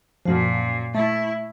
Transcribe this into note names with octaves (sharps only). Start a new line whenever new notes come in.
F#2 A#2 F3
A3 E4